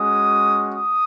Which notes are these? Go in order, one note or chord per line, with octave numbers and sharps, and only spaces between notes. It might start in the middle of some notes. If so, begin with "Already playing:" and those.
Already playing: G#3 C#4 F#4 D#6
D#6